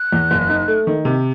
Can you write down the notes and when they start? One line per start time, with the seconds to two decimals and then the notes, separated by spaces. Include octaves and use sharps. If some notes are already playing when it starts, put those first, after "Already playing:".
Already playing: F#6
0.12 E2
0.31 F#1
0.49 D#4
0.68 A3
0.87 D#3
1.05 C3